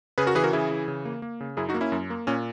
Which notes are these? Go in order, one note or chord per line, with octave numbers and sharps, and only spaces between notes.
C#3 G#4 B4
F#4 A#4
E3 G#4 B4
F#4 A#4
C#3 E4 G#4
E3
C#3
A#3
A#3
C#3
F#2 E4 G#4
D#4 F#4
A#3
C#4 E4
F#2
A#3
A#2 C#4